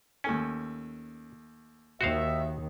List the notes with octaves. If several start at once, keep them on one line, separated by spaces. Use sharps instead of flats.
D#2 A3 C#4 G#5
D#2 D#3 F#4 C5 E5 F5